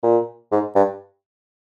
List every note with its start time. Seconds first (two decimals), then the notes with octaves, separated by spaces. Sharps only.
0.03 A#2
0.52 G#2
0.75 G2